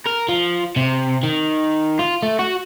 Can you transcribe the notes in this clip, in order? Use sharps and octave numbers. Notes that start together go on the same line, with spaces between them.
A#4
F3
C3
D#3
F4
A3
F#4